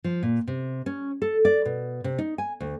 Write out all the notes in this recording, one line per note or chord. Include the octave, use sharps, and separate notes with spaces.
F3
A#2
C3
C#4
A4
D5
B2
C3
D#4
G#5
D2